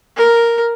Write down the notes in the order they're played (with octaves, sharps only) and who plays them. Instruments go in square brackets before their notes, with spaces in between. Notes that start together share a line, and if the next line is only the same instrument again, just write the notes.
[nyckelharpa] A#4